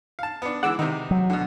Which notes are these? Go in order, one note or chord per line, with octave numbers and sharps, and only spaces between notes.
F5 A5
B3 D4
E3 G#3 F#5 D6 E6
C3 D#3 D#4
F#3
B2 D3